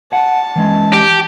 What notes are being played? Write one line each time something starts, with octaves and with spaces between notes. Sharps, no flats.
F#5 A5
E3 G#3 C#4
G4